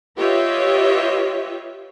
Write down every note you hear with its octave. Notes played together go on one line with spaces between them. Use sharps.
F4 G4 B4 C#5 D#5 E5